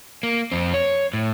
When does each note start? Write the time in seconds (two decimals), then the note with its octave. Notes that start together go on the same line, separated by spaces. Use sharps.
0.23 A#3
0.52 F2 C4
0.74 C#5
1.14 A2